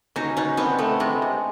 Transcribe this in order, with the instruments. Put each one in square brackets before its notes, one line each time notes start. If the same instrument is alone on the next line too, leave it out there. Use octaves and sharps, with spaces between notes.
[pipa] F#3 [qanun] C#4 D#4
[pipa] B2 [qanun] C#4 D#4
[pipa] B3 [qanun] C4 D4
[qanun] A3 [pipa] B3
[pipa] C3 [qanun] G#3
[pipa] C3